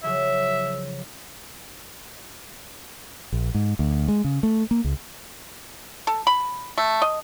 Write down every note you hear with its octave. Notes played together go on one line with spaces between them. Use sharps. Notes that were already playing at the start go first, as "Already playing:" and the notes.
C#3 F3 F#3 E5
A#1
G#2
D2
G#3
C#3
A3
A#3
C#2
A4
B5
A3
D#5